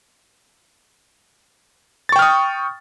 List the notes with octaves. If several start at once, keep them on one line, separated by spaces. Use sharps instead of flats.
G5 C#6 D#6 F6 A6